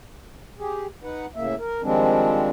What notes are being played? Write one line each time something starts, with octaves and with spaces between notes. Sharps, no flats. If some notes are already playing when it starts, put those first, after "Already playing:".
G4 G#4
D#4 B4 F#5
A2 C#3 A#3 E5
A#4
D#3 F3 G3 G#3 C4 D4